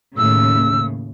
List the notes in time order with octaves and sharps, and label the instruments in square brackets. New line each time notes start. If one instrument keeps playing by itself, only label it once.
[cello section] D#2 A2 C#3 [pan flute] E6